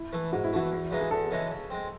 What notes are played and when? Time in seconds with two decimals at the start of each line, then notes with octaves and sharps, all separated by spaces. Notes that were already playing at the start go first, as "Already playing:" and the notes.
Already playing: E4
0.13 E3 A3
0.32 G#2 F#4
0.44 E4
0.53 E3 A3 F#4
0.72 E2
0.91 C#3 E3 G#3 D#4
1.01 G#4
1.11 E2 A4
1.31 C#3 E3 G#3 D#4
1.51 C#3
1.70 G#3 C4